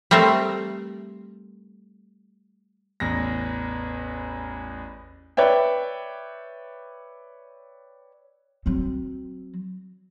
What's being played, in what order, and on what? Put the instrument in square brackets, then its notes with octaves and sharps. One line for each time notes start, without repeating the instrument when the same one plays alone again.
[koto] G3 A3 C4 A#4 D5 A5
[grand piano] A1 E2 A#6
[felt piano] B4 C#5 D5 E5 G5
[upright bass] F#3 C4